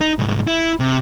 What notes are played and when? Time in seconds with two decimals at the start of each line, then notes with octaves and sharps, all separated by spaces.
0.01 D#4
0.19 C2 G#2
0.47 E4
0.80 C3